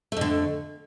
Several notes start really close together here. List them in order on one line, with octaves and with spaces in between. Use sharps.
A3 F2 D3